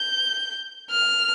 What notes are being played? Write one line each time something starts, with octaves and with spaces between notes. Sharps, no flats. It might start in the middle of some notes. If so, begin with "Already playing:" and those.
Already playing: G6
F6